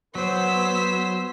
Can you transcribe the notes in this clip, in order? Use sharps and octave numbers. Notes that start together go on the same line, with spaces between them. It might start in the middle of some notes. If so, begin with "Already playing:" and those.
F#3 B3 C5 E6 B6